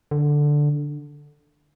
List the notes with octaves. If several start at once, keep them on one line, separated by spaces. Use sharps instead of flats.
D3